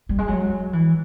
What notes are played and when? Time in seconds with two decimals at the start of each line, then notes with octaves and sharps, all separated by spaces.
0.09 G3
0.19 G#3
0.28 F#3
0.73 E3